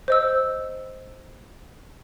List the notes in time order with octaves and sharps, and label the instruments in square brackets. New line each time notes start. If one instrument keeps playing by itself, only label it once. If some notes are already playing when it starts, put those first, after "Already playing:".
[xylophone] C5 D#5 E6